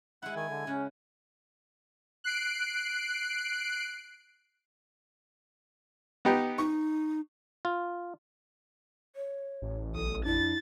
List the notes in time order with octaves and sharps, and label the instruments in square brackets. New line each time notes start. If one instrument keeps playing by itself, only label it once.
[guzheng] G#3 E4 [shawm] F#5
[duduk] D#3 [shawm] G#5
[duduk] D3
[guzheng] C#3 F#5 [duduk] C#4
[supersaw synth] F#6 C7 D7
[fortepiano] B3 D#4 G4
[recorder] D#4 [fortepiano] C#6
[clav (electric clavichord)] F4
[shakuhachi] C#5
[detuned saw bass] A1
[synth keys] B1 [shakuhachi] A4 [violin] D#6
[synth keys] F2 D4 [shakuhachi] E4 [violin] A6